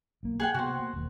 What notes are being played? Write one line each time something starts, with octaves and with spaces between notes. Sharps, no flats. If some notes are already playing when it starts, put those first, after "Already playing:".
B1 A#3
G#4 F#5 G5
C3 B3 F#4 C5
A#3
E1 D#2 A#3